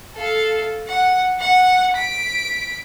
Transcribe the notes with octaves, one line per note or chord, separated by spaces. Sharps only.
A4 F5
F#5
F#5
B6 D7